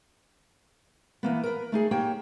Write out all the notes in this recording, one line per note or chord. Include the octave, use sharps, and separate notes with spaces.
E3 A#3 B3
A#4 B4
A3 D#4 G#4
A#3 G4 C#5 G5